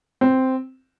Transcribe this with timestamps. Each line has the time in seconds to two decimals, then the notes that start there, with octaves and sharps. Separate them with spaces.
0.21 C4